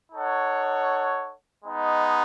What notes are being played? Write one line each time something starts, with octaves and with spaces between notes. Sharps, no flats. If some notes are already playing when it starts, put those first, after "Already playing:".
D#4 A4 C#5 F#5
G#3 B3 D#4